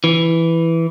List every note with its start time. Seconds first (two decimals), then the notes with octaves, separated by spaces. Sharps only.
0.04 E3